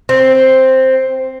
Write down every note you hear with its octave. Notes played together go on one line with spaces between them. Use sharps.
C4